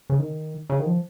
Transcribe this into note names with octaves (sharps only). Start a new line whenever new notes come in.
C#3
D#3
C#3
D#3
F3